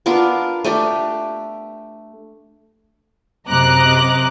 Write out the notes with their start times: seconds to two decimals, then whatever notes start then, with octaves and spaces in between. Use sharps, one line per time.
0.06 B3 D4 F4 A#4
0.64 A3 D4 G4
3.47 F#2 C3 D#5 A#5 D6 F#6